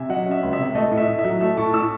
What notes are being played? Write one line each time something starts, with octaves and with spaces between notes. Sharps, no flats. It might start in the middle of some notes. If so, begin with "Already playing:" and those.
Already playing: C3 E5 G#5
F#3 D#5 F#5
C#4
E5
C#2
E5
C3
A3 D#5
A2
E5
A2
E5
F#3
A3 E5
A2 A5 C#6
A2 C#6 E6